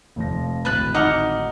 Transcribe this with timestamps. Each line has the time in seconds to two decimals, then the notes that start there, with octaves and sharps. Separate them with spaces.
0.16 F1 F3 A#6
0.65 D1 G#1 B4 A5 F#6
0.95 D#4 F#5 D6 F6